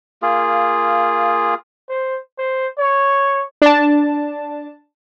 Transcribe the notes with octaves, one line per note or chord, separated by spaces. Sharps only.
A#3 F4 G#4
C5
C5
C#5
D4 A5